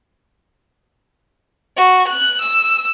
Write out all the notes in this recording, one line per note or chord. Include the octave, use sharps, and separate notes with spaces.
F#4
F#6
E6